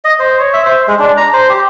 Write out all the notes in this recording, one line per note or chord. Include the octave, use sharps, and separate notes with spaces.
D#5
C5
C#5
E5
C5
G#3
D4
A#5
C5
G4